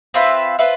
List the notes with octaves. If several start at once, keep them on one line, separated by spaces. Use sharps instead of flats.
C4 F4 B4 E5
C4 F4 B4 E5